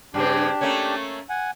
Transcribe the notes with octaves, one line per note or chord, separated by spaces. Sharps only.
G2 C#3 C4 D4 G4
A3 A#3 C#4
F#5 G#5